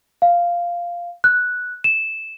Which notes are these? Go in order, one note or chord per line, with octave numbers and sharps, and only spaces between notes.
F5
F#6
E7